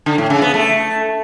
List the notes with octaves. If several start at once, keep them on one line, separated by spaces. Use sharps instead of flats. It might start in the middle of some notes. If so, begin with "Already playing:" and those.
D3
A2
C#3
B3
A3